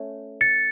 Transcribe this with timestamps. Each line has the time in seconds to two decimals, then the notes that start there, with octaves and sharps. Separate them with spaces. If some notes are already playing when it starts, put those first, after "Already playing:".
Already playing: A3 C#4
0.41 A6 C#7